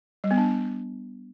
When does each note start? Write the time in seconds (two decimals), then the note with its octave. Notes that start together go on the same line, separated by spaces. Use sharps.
0.24 G3
0.31 B3
0.38 D4